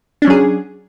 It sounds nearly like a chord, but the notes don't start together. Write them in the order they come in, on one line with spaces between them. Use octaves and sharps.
D4 C#4 F#3 G#4